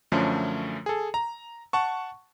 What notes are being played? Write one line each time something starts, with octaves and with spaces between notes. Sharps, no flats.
F#2 D3 F3 A3 C#4
G#4 A4
A#5
F#5 A5 C#6